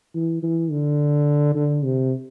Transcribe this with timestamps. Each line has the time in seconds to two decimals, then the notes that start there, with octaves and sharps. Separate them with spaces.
0.15 E3
0.43 E3
0.71 D3
1.55 D3
1.83 C3